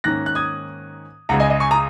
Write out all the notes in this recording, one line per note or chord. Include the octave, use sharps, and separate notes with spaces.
G#2 D#3 A#3 C#4 F#6 A#6
F#6
D#6 G#6
C#2 C#3 G#3 F#5 A#5
D#5 G#5
D#5
G#5 C#6
A#5 D#6